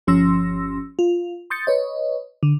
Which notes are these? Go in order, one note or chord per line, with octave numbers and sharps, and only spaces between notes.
G1 F3 C#4 C6 E6 A#6
F4
C6 D#6 G6 A6 C#7
B4 C#5 D#5
D3